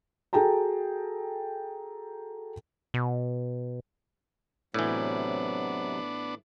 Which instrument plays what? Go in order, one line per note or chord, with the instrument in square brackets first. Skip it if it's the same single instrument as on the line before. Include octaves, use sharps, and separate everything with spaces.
[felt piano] F#4 G#4 A4 G5 A5 A#5
[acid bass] B2
[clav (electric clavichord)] A2 E3 [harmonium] C3 F#3 [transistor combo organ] B3 D4